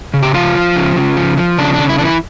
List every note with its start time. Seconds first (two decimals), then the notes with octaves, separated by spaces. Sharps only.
0.14 C#3
0.22 G4
0.34 F3 F4
0.55 F3
0.76 C#3
0.96 C#3
1.17 F3
1.38 F3
1.58 C#3 D4
1.74 D4
1.79 C#3
1.89 E4
1.99 E3 D4
2.05 E4